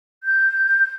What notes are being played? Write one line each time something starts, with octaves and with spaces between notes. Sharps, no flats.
G6